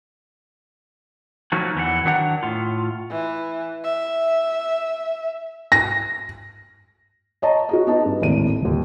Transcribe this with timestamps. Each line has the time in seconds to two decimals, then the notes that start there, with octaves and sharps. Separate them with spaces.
1.52 F3 F#3 A3 A#3 D#4 F#4
1.75 E2 E3 E4 F#5
2.05 D#3 F#3 D4 F#5 A#5
2.43 A2 F4
3.10 E3
3.84 E5
5.72 A#6
7.42 C#5 D#5 A5 A#5
7.69 F#4 G#4 D#5
7.87 B3 D#4 D#5 A5
8.05 G2
8.21 G#1 D#2 A2 D#7
8.62 D#1 D#2